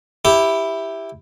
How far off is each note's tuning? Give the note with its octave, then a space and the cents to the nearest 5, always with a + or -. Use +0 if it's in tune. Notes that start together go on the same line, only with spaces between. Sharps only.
E4 +0 G4 +10